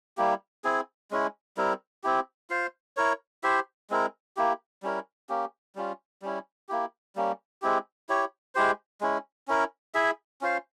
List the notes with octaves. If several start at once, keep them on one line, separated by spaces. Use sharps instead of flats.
G3 A#3 E4 G4
C4 E4 G#4
G#3 C#4 E4
G3 C4 E4 A#4
C4 E4 G4
F4 C5 F5
E4 A#4 C#5
E4 G4 C5 E5
G#3 C4 E4 A#4
A#3 E4 G4
G3 C#4 E4 A#4
A#3 C#4 G4
G3 C#4 F4
G3 C#4 E4
A#3 E4 G4
G3 A#3 C#4
G#3 C4 E4 G4
E4 G4 C#5
G#3 E4 G4 C5
G#3 C#4 E4
C#4 E4 A#4
E4 G#4 E5
C#4 F4 C5 F5